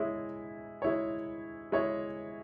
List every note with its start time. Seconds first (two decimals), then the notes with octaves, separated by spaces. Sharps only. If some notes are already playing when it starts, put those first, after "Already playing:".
Already playing: G#3 E4 C#5
0.82 G#3 E4 C#5
1.72 G#3 E4 C#5